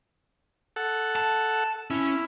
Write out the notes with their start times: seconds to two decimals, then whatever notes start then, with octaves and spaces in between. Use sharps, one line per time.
0.76 A4 F#5
1.16 A5
1.90 C#4 E4